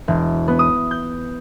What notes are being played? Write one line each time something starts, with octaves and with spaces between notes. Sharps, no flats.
E1
B3
D#6
G6